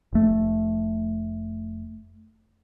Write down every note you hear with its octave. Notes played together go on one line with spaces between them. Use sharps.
F1 A3